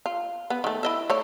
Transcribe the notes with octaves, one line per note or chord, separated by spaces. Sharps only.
F4
B3
D#3 A3
E4 D#5 E5
A3 C#5 D5